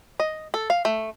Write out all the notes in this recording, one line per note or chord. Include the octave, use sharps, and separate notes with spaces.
D#5
A4
F5
A3